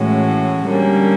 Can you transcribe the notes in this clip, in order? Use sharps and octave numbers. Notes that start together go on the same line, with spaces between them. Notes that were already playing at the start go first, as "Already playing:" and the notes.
Already playing: A2 E3 G#3 C#4 F#4
D3 G3 A#3 C#4